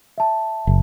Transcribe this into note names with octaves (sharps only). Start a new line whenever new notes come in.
E5 A5
F#1